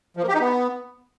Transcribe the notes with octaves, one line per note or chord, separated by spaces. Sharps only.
F3
A#3
G4
D#4
B3